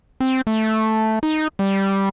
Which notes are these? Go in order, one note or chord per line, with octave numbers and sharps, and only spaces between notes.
C4
A3
D#4
G3